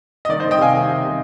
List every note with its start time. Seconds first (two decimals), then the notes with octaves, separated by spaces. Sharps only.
0.25 D#5
0.29 D#3 D5
0.40 C5 D#5
0.45 D#3
0.51 D#5 G5
0.58 C3 F5 G#5
0.73 D#3
0.88 C3
1.02 C3